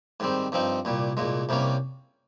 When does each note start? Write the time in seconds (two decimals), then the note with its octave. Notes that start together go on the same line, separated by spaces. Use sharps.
0.20 G#2 D#3 G3 C4
0.52 G2 F3 C4 D#4
0.85 C2 A#2 G3
1.17 C2 A#2 G#3
1.49 C2 C3 G3 A#3 C#4